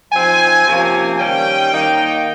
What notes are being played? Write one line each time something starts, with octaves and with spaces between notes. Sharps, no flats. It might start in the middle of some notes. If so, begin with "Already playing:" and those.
F3 C4 D#4 G#5
C3 F3 A#3 C#4
D#3 G3 C#4 G5
D#3 A#3 D#4